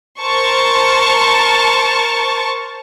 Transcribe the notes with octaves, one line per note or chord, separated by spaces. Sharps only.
A#4 C5 A5 C#6